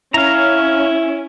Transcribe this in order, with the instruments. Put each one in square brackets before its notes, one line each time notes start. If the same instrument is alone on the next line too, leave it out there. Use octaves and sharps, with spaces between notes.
[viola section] C#4 [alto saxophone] E4 [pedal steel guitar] F5 A#5